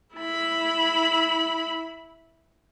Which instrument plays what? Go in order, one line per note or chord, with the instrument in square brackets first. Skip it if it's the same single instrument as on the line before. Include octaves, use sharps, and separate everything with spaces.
[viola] E4 B5